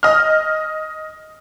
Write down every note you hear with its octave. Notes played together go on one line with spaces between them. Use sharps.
D#5 F6